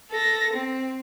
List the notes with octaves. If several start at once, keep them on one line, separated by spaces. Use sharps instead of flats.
A4 A#6
C4